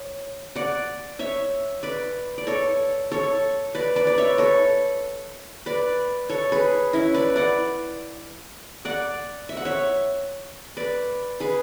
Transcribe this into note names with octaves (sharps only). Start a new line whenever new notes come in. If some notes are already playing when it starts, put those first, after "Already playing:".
Already playing: C#5
D5 F#5
C#5 E5
B4 D5
D5
A4 C#5
A4 C#5
B4 D5
B4 D5
D5
C#5 E5
A4 C#5
B4 D5
A4 C#5
G#4 B4
C#4 E4
B4 D5
D5 F#5
D5 F#5
E5
F#5
C#5 E5
B4 D5
G#4 B4